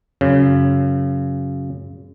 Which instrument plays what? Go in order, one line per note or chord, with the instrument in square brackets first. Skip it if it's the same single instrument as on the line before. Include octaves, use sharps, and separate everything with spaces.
[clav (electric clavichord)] F#2 C#3